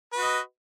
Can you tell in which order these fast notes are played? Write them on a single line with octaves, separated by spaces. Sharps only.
B4 F#4 D#5